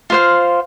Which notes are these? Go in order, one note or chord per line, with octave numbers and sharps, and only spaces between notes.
F4 C5 F5